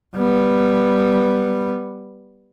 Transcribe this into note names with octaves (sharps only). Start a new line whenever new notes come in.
G3 B3